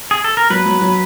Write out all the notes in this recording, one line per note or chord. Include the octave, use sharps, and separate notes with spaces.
G#4
A4
A#4
F#3 B4
F#3
F#3